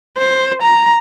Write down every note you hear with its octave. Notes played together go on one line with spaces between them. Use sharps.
C5
A#5